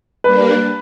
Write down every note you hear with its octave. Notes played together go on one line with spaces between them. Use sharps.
G3 A#3 D4 B4